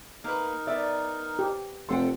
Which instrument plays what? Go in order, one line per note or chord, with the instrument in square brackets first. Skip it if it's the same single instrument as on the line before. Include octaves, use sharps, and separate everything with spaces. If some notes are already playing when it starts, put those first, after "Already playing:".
[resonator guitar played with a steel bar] A#3 B4 [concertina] D#4 A#4
[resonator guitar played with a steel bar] B3 D5 [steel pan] E5
[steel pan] G4
[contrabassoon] F1 [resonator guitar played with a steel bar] A4 F#5 G5 [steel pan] C6